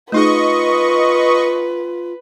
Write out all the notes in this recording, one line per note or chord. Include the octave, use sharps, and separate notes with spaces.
A3 D#4 F4 G#4 B4 D#5 C#6